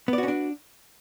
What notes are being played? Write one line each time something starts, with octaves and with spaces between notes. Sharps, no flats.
B3 C#4 D4 F#4 D5